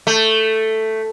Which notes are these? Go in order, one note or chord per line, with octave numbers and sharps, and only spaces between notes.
A3